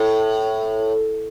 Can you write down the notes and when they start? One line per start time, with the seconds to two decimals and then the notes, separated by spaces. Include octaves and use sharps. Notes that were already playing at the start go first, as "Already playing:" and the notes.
Already playing: A2